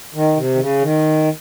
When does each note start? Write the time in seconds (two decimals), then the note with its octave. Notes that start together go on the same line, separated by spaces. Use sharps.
0.14 D#3
0.36 C3
0.55 D#3
0.59 C#3
0.82 D#3